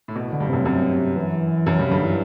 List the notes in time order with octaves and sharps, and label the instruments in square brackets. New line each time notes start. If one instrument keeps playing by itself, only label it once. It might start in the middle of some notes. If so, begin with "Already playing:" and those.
[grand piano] A2
B2
A2
[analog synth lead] D3
[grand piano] G2
[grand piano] F#2 [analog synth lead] C3
[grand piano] F#2 [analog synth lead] C3
[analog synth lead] C3
E3
[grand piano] F#2
[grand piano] G2 [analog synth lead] C3
[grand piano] G2 [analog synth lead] D3
[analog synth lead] E3